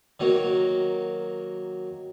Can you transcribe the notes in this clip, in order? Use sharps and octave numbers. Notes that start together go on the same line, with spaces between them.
D#3 F#3 A#3